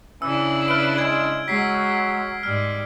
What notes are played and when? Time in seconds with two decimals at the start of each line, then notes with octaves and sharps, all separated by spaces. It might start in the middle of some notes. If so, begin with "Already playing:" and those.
0.22 C#3 E3 D4 E4 E6
0.68 B4 F6 D7
0.98 G#3 G#6
1.48 F#3 G#3 B6 C7
2.43 G#2 G3 F6